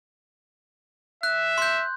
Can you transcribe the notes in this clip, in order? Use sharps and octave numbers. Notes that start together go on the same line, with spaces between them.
E5 F#6
C6 G6